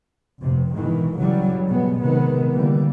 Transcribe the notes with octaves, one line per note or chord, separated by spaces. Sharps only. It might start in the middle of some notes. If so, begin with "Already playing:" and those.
F1 G2 C3
G#2 B2 D#3 E3
G2 C#3 E3 F#3 G3
B2 G#3 B3
C3 D#3 F#3 G#3 B3
D3 E3 G3 A#3